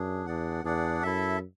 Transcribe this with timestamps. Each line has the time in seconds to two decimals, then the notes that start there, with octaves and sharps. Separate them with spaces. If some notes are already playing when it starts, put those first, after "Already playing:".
Already playing: F#2 D4 G#4
0.26 E2 D4 G#4 D5 F#5
0.64 E2 D4 G#4 D5 F#5
1.03 F#2 E4 A4 E5